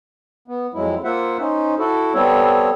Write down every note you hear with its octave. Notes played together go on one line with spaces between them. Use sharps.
B3
F2 F#3 G#3 E4
A#3 F4 C5 E5 F#5
C#4 D#4 C5
E4 F#4 A4
G3 B3 C4 A4 C#5